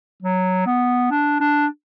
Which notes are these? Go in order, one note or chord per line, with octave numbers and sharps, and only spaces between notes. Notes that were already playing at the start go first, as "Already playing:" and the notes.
F#3
B3
D4
D4